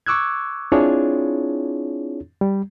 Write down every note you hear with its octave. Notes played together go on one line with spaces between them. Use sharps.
C#6 D6 E6 F#6 G#6
C4 D4 E4 F4 G#4 C#5
G3